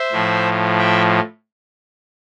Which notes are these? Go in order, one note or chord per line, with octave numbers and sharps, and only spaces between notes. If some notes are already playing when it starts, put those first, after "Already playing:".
Already playing: C5 E5
A2 F3
E5 G5